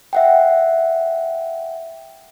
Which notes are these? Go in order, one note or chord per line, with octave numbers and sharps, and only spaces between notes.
E5 F#5 G5